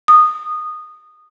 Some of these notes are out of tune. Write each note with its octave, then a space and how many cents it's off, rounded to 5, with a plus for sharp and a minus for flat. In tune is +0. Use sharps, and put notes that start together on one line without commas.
D#6 -15